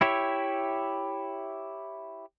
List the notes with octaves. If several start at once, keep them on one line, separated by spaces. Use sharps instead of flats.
E4 G4 C#5 E5